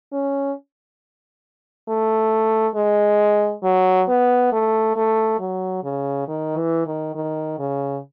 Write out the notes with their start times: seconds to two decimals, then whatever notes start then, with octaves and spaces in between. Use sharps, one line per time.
0.13 C#4
1.88 A3
2.75 G#3
3.63 F#3
4.08 B3
4.52 A3
4.96 A3
5.39 F#3
5.84 C#3
6.28 D#3
6.57 E3
6.86 D#3
7.15 D#3
7.59 C#3